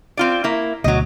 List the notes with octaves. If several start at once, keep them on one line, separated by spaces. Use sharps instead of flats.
C4 F4 D5
A#3 E4
D2 B2 F#3 D#5